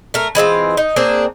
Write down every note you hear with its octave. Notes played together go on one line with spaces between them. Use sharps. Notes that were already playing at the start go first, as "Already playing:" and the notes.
A3 A#4
E3 G#3 C4 F4
D#4
A#3 C4 D4 G#4